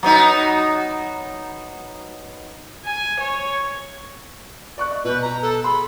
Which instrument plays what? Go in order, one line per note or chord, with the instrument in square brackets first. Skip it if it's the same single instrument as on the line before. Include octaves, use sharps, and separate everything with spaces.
[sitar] F#3 B3 D#4
[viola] G#5
C#5
[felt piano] D5 C#6 F#6
D#5
[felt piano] B2 G6 [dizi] B4
[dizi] A#5
A4
[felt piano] G#4 C6 [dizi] B5